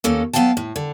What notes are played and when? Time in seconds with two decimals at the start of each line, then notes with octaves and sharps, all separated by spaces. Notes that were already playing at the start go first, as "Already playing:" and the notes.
0.04 D#2 A#3 C#4 A4
0.33 F#3 B3 C4 F5 G5 A5
0.57 A2
0.76 D3